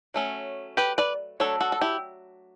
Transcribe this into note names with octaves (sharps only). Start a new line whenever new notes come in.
F#3 A3 C#4
G4 B4
B4 D5
F#3 A3 D4 A4 C#5
F#4 A4
A4
E4 G4